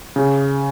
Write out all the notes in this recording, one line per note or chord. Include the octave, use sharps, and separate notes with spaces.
C#3